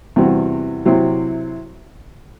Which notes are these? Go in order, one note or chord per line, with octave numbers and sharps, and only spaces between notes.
E2 C3 G3 C4 F#4
C3 F#3 C4 E4